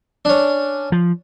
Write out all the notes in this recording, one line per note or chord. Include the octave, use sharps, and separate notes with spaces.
C#4 D4
F3